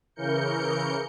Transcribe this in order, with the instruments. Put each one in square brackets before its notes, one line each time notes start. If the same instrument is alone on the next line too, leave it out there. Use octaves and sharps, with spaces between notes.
[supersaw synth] C#3 E3 A#4 G6 C#7